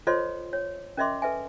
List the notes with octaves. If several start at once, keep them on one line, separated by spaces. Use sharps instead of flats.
F4 A4 C5 C#5 D#5 C6
C#5
C#4 A#4 D#5 E5 C6 D6
A4 B4 E5 G#5